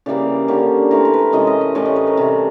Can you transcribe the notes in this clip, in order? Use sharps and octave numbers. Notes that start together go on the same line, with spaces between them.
C#3 E3 G3 A#3 D5
D3 G3 A#3 C#4
E3 A3 C4 A#4
A#4
B4
A#4
C3 E3 G#3 C#4 D#5
D#5
D#5
A2 E3 A3 C#4 D5
D#5
B4
A#4
C3 E3 G3